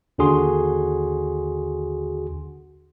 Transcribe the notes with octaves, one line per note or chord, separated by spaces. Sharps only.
D#2 D3 D4 F#4 G#4 C6